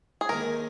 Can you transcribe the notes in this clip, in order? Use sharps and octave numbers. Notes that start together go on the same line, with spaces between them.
G#4
D#2 D#3 G#3 A#4